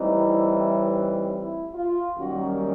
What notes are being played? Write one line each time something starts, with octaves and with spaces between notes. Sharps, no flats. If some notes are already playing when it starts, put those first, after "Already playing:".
Already playing: A2 E3 G3 C4 D#4
E4
E4
D#4
E4
F4
F#2 D#3 G3 A#3 C#4 F#4